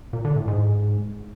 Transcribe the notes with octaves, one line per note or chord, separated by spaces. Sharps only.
A#2
D3
A2
G#2